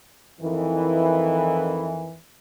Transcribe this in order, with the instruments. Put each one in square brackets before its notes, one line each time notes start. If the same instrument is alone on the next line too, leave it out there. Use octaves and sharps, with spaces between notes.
[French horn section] F2 D#3 E3